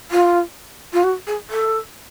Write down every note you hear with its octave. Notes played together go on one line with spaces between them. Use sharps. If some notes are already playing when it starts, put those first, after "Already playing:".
F4
F4
F#4
G#4
A4